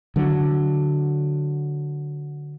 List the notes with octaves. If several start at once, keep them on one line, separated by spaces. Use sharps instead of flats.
D3 F#3